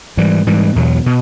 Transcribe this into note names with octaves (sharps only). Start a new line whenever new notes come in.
G#2 E3 G3
G#2 E3 G3
E2 B2 F#3
B2